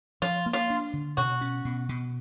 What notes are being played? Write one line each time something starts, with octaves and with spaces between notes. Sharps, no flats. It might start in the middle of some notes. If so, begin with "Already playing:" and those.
F3 F4
A#3
F4
D4
D3
B2 F#4
C#4
B2
B2